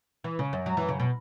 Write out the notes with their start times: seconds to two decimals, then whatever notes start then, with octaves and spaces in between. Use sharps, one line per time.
0.24 E3
0.39 C#3
0.53 F#2
0.66 F#3
0.77 E3
0.89 C#3
1.00 B2